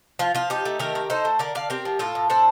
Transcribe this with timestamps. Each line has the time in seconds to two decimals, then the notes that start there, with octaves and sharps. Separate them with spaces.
0.19 F3 F4
0.35 F3 F4
0.50 D#4 G4
0.65 A3
0.79 D#3 G4 A#4
0.95 D#3
1.10 D#4 A4 C5
1.25 A3
1.39 D3 A#4 D5
1.55 D3 D5 F5
1.70 C4 G4 A#4
1.85 F3
1.99 A2 F4 A4
2.15 A2
2.30 D4 A4 C5